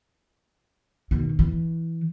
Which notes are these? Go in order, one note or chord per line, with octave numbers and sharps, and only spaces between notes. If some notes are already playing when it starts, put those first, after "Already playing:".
B2 D#3
E3